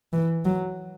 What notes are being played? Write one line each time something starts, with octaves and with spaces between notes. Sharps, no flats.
E3
F#3